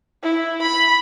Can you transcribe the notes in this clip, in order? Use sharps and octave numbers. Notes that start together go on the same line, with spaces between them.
E4
B5